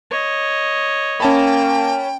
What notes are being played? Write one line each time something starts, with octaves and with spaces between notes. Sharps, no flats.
C#5 D#5
A#3 C#4 G5 A5 B5